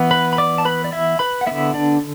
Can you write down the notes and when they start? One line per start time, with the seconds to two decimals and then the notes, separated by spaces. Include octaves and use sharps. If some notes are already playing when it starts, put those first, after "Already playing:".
Already playing: E3 B3
0.11 B4 B5
0.33 B5
0.38 D5 D6
0.58 A5
0.65 B4 B5
0.84 D5
0.92 E4 E5
1.19 B4 B5
1.41 F#5
1.47 D3 B3 E4 E5
1.74 D4 D5